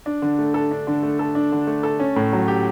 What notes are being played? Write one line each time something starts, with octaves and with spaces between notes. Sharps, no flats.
D4
D3
A3
A4
D4
D3
A3
A4
D4
D3
A3
A4
C#4
A2
F#3
G4